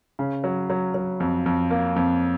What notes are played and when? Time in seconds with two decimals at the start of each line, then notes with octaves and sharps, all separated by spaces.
0.19 C#3
0.44 F#3
0.70 F#3
0.94 F#3
1.20 F2
1.46 F2
1.71 A#3
1.96 F2